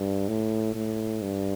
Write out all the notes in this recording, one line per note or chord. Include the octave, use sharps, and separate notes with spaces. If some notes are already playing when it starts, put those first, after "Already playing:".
Already playing: G2
A2
A2
G2